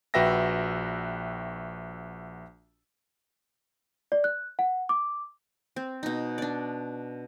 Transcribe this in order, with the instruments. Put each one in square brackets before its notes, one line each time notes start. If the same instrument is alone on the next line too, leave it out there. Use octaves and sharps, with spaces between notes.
[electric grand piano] A#1 F#4 B4 E5 G5 A#6
[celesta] D5
F#6
F#5
D6
[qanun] C4
B2 D#4
D4 D5